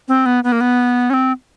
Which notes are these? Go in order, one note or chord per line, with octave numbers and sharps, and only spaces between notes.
C4
B3
B3
A#3
B3
C#4
C4